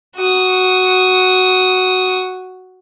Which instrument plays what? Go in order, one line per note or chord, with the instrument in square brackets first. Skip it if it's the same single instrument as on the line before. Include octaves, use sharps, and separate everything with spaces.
[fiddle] F#4 D#6